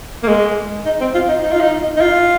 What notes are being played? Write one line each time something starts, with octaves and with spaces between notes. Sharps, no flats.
A#3
G#3
D#4
C4
F4
D#4
D#4
F4
D#4
D#4
F4